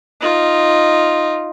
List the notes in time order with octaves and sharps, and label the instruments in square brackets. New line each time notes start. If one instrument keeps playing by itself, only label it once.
[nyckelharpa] D#4 F4